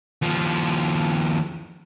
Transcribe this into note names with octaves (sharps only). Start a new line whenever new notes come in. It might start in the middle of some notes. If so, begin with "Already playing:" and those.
D#2 F3